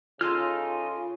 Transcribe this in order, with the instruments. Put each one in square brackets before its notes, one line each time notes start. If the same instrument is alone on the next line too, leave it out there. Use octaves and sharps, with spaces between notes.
[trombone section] C#3 [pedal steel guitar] D#4 A4 F6 [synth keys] F4 C6